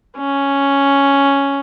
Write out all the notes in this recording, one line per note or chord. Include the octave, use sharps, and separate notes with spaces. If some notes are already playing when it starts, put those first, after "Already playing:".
C#4